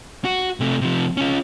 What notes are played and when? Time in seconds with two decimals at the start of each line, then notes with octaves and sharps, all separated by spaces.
0.25 F#4
0.60 C3 A3
0.81 C3 F3
1.17 C#4 F4